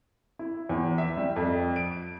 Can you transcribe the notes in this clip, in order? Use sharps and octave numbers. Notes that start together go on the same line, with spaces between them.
E4
E2
E5
G3
F2
D7